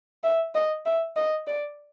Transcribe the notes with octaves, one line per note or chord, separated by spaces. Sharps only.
E5
D#5
E5
D#5
D5